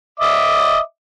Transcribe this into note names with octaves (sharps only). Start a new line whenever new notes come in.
D#5 E5 D6